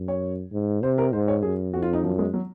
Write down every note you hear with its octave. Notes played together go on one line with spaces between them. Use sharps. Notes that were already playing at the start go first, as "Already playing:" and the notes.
Already playing: F#2
C#5
G#2
C3 C5
A#4
G#2 C5
C#5
F#2 G#4
F2 F#4
F4
D#4
F#2 F3
G#3
F#3